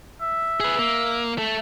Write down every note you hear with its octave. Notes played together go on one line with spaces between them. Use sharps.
E5
G#4 B4
A#3
A3